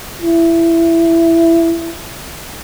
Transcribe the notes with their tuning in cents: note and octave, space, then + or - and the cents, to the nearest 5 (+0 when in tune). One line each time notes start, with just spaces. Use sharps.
E4 +15